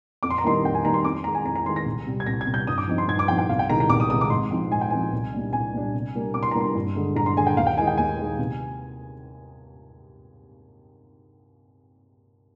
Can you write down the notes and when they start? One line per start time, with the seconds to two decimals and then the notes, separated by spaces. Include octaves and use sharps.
0.23 F2 D6
0.30 C6
0.38 A#5
0.43 D#3 G3 A#3 D#4 C6
0.63 F2 G5
0.74 G#5
0.83 D#3 G3 A#3 D#4 A#5
0.94 C6
1.04 F2 D6
1.15 C6
1.24 D#3 G#3 A#5
1.35 G#5
1.45 F2 A#5
1.56 A#5
1.65 D#3 G#3 C6
1.76 A#6
1.86 C2
2.07 C3 G3
2.20 G#6
2.26 C2 A#6
2.41 G#6
2.47 C3 G3
2.54 G6
2.67 G2 D#6
2.78 D6
2.88 F3 C4 D#4
2.98 C6
3.08 G2 G#6
3.19 D6
3.28 F3 C4 D#4 G5
3.38 G5
3.49 C2 F5
3.59 G5
3.69 C3 D#3 G#3 A#5
3.80 A#5
3.90 C2 D6
4.00 D#6
4.10 C3 D#3 G#3 D#6
4.21 D6
4.30 G#2 C6
4.51 F3 C4 D#4
4.72 G#2 G#5
4.81 G5
4.90 F3 C4 D#4 G#5
5.13 C2
5.33 A#2 G3 D4
5.53 C2 G#5
5.73 A#2 G3 D4
5.94 C3
6.15 G3 A#3 D4
6.34 C3 D6
6.43 C6
6.51 A#5
6.55 G3 A#3 D4
6.60 C6
6.75 G2
6.96 D3 G#3
7.16 G2 A#5
7.26 C6
7.37 D3 G#3 G#5
7.47 G5
7.57 D#2 F5
7.67 G5
7.77 D#3 G#5
7.80 G#3 D#4
7.87 G5
7.98 D#2 G#5
8.19 D#3 G#3 D#4
8.38 C3